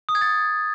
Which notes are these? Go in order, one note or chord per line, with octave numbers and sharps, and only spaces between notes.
D#6
G#6
A6